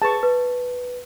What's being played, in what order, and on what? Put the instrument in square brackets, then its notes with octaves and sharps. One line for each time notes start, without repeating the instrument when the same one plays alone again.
[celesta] G#4 B4 [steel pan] A5 C#6
[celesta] B4